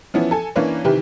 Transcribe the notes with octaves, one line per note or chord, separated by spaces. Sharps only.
E3 F3 B3 C#4 E4
A4 G#5
E3 A#3 C#4 D4 B4 C#5
C3 D#3 E3 G4 B4